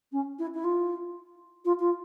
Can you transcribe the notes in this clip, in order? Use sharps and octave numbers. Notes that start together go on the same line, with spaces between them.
C#4
E4
E4
F4
F4
F4